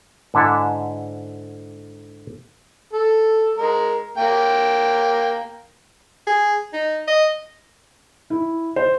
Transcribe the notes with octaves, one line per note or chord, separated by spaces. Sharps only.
G#2 D3 E4 A4
A4
G#3 A#4
A#3 G5
G#4
D#4
D#5
E4
C5